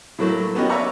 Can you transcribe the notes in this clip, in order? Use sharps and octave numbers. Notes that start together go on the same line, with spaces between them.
A2 F#3 A3 A#3
A#3 B3 C#4 F#4 G4 D#5
B4 C#5 D5 E5 A#5 C#6